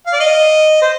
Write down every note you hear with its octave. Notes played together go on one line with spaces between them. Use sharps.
F5
D5
D#5
C5